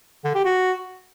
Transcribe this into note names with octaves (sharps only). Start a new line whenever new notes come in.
D3
G4
F#4